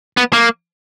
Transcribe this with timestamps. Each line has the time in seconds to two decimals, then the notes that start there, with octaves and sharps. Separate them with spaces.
0.17 B3
0.33 A#3